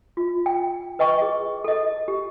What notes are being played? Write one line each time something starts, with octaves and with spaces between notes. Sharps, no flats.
F4
G5
B4 D#5 G5 C#6
G#4
A4 D#5
G4